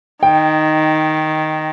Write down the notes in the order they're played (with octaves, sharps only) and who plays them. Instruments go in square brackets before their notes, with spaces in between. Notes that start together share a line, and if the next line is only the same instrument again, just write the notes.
[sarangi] D#3 [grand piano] G5